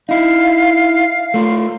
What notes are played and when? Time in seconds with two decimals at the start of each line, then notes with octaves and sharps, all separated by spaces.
0.09 D#4 E4 F5
1.34 A3 F4